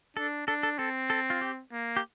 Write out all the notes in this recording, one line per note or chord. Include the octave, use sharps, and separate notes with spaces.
D4 A4
D4 A4
A4
C4 A4
A4
F4
G4
A#3
G4